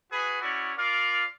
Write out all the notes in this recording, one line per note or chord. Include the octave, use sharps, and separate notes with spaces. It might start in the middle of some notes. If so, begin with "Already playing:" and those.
F#4 G#4 B4 B5
C#4 E4 F#4 D5
F4 A#4 D5 F5